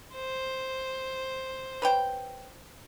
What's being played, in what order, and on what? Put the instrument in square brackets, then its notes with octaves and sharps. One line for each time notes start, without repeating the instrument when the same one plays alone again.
[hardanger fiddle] C5
[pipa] B4 C#5 G5